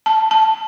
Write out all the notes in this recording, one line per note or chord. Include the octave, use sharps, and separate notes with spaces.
A5
A5